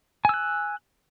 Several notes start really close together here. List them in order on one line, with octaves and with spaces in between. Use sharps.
G#5 E6 F#6